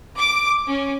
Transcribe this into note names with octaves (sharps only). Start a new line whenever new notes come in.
D6
C#4